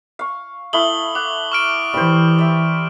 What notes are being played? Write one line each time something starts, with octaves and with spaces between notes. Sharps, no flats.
F5 C#6
A3 E4 F5 D#6 F#7 G7
F#5 D6
C#6 F6 D7
E3 G3 C5
G3 E5